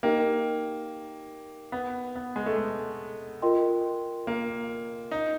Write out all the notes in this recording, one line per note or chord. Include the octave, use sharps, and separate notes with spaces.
A#3 D#4 G4 A#4 D#5 G5
B3
B3
G#3
A3
G#3
F4 A#4 D#5 G5 C6
A#3
D#4